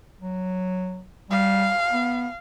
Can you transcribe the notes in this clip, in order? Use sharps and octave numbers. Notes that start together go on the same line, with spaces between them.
F#3
G3 F5
B3